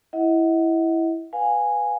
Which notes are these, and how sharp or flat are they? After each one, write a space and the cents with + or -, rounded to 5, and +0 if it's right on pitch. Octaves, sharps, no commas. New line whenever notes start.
E4 +0 D#5 +40 F#5 +0
B4 +0 F5 +25 G#5 -5